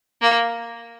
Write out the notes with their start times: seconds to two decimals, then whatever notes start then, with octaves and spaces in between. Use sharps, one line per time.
0.22 A#3